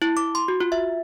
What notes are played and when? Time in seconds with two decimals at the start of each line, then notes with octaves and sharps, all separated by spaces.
0.02 E4
0.17 D6
0.35 C6
0.48 F#4
0.60 F4
0.72 E5